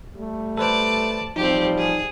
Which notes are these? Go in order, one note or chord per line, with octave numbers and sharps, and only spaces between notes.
G3 A3
A4 B4 C5 D5 A5
A1 F3 G3 C4 D#4 G4
G#4